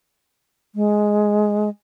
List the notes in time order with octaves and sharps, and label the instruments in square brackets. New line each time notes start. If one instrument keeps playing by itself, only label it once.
[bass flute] G#3